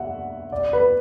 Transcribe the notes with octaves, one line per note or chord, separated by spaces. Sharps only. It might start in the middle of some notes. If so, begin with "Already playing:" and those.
Already playing: E5 F#5
D5
B4